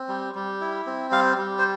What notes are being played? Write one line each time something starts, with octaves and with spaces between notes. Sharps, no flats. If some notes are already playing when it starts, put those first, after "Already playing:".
Already playing: C4
G3
G3
E4
C4
G3 F5
G3
C5